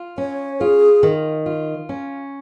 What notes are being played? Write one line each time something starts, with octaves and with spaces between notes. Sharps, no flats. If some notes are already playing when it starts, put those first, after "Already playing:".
Already playing: F4
C#4 C#5
F4 G#4
D#3
F4
C#4